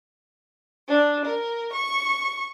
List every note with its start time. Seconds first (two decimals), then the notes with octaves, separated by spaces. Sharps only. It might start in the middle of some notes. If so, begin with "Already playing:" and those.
0.87 D4
1.25 A#4
1.72 C#6